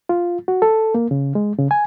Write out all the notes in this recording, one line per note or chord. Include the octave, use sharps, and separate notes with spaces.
F4
F#4
A4
A#3
C#3
G#3
C#3
G#5